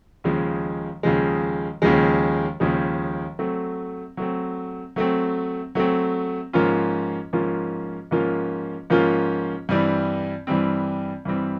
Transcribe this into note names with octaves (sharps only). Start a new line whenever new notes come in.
D#2 C#3 F3 G#3
D#2 C#3 F3 G#3
D#2 C#3 F3 G#3
D#2 C#3 F3 G#3
F#3 A3 C4
F#3 A3 C4
F#3 A3 C4
F#3 A3 C4
G#2 F3 A#3 C#4 F4
G#2 F3 A#3 C#4 F4
G#2 F3 A#3 C#4 F4
G#2 F3 A#3 C#4 F4
G2 E3 G3 C4
G2 E3 G3 C4
G2 E3 G3 C4